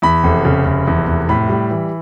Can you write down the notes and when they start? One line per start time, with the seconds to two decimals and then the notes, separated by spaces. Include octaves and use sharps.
0.02 E2 B5
0.24 F1
0.45 C#3
0.65 F1
0.87 E2
1.07 F1
1.29 A2 B5
1.49 G3
1.71 E3